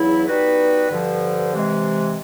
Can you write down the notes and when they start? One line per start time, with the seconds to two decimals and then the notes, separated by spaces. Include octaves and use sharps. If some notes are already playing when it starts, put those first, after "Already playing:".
Already playing: E2 C#3 F#3 E4
0.27 G3 B3 D#4 F#4 B4
0.90 G2 D3 F3
1.53 C3 E3 G#3